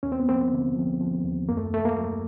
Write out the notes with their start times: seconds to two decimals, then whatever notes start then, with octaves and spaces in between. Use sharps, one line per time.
0.03 D#2 C#4
0.12 C4
0.20 B3
0.28 F3 A#3 C4
0.52 D3
0.76 F3
1.01 F3
1.24 D#2
1.49 F#2 A#3
1.57 A3
1.73 F#2 A3
1.85 A#3
1.97 F#3